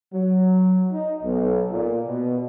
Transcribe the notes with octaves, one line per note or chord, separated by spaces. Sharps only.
F#3
D#4
B1
A#2
B2